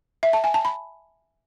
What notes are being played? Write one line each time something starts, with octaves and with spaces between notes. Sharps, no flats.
E5
A5
G#5
A5
B5